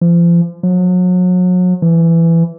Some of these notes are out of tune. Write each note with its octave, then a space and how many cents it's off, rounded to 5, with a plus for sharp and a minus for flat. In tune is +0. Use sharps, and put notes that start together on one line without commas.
F3 -35
F#3 -35
E3 +15